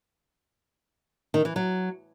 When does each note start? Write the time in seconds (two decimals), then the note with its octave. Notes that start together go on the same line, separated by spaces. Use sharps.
1.34 D#3
1.45 E3
1.56 F#3